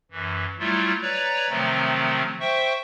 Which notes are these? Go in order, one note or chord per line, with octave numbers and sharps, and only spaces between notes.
F#2 E3
F#3 G3 A3 E4 F4
B4 C#5 D5 A#5
C3 D#3 F3 F#3 A3 C4
C5 E5 G5 C#6